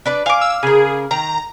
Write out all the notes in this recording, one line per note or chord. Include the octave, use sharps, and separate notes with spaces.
D4 B4 D5
F5 G#5 D6
E6
C#3 G#4 A#4
D#3 A#5